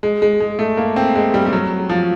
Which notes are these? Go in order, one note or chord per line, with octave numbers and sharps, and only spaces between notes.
G#3
G#3
G#3
A3
A#3
C4
G#3
G3
G3
F#3
F3